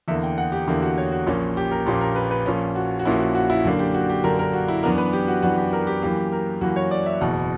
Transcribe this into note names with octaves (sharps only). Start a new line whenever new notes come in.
E2 D3 A#3 E5
G5
F#5
G4
E2 D3 A#3 E4
F#4
C#5
F#4
A#1 A#2 A#3 C#4
G4
A#4
A#1 A#2 A#3 C#4 G4
A#4
B4
B4
A#1 A#2 A#3 C#4
F#4
F#4
A#1 A#2 A#3 C#4 E4
F#4
F#4
E4
F#2 D3 A#3 D4 F#4
G4
F#4
G4
F#2 D3 A#3 D4 A#4
A#4
F#4
E4
F#2 E3 B3 D4 A#4
B4
G4
F#4
F#2 E3 B3 D4 F#4
G4
A#4
G4
F#2 E3 A#3 G4
A#4
F#2 E3 A#3 F#4
C#5
D5
E5
F#1 E2 B2 F#5